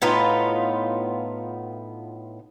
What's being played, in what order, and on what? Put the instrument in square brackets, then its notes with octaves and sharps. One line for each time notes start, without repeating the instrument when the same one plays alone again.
[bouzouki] A2 B3 D#4 F4